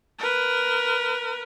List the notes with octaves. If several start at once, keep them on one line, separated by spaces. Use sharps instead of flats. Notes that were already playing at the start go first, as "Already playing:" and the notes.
A#4 B4